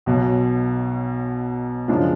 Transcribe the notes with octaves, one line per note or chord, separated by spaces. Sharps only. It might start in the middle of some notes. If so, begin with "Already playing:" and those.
B1 B2 F#3
F#2 C#3 F3 G#3 D4